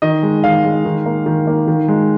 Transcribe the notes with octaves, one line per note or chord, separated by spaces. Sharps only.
D#3 D#5
G#3
D#3 F5
G#3
D#3
A#3
D#3
A#3
D#3
G#3